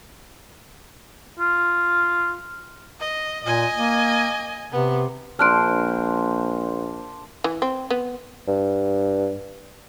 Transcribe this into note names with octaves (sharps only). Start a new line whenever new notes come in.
F4
D#5
A#2 D#5 G#5
A#3
C3 B3
A#1 D4 C5 C6 F6 F#6 D7
E3
C4
B3
G2